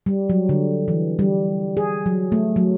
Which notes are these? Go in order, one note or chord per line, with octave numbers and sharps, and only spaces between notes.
G3
F#3
D3
E3
G3
G#4
F#3
A3
F#3